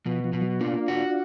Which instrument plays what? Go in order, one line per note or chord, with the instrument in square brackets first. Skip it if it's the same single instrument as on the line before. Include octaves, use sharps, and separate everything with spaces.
[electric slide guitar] B2 [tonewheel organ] F3
[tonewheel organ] F3
[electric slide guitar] B2
[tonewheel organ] F#3
[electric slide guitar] A#3 [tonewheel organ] D4 F4
[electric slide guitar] F#4